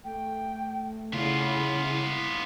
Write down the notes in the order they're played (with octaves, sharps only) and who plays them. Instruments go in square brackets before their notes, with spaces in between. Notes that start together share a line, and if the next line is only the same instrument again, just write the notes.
[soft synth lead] A3 [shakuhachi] G5
[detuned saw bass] C#3 [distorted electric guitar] B3 F4 [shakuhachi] E4